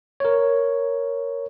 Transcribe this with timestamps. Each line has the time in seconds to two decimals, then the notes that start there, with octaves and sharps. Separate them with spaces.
0.20 A#4 C#5